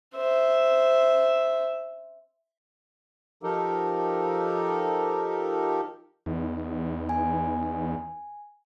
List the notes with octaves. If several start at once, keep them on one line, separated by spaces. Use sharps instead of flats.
C5 E5
F3 D#4 G4 A4 A#4
E2 B3 D#4
G#5